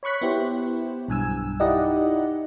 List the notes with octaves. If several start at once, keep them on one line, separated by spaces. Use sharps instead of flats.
C#5 B5 C#6 F#6 B6
B3 E4 G4 C5
B1 G2 G#5 E6
D#4 E4 G4 D5 D#5 F#5